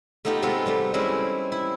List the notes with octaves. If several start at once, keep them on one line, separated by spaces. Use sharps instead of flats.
A3 B3 D#4 F4 G4
C3 G#3 B3 F4 A4 B4
C3 G3 A3
G3 G#3 C4 C#4 E4 B4
E4